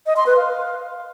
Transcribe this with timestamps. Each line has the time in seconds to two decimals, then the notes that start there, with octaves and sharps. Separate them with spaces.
0.06 D#5
0.16 C6
0.27 B4
0.37 F5